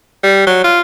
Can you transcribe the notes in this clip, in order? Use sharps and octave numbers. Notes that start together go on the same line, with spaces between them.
G3
F#3
F4